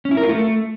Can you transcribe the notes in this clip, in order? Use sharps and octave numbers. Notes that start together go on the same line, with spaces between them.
C#4
E4
A#4
F4
A3